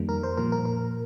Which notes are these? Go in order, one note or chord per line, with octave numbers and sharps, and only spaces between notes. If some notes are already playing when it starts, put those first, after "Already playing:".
Already playing: F2 D#3 G3 A#3
A#4
C5
A#2 F3 A#3 A#4
A#4
A#4